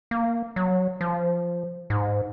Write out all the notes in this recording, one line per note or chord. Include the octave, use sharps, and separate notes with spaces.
A#3
F#3
F3
G#2